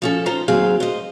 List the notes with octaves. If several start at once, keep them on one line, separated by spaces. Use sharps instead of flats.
F3 C#4 A4
D#4 F4 C5 A#5
D#2 F#3 C4 G#4 F5
C5 D#5